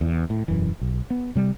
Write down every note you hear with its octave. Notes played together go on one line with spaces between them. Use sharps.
E2
A2
E1 F#2 E3
B1
B3
C3 G3